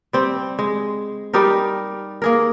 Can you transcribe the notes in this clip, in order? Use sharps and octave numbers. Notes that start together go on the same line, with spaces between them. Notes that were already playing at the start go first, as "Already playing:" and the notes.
G3 C4
G#3
G3 D#4 G4 A#4
A#3 G#4 A#4